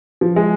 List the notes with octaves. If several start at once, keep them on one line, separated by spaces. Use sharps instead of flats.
F3
G#3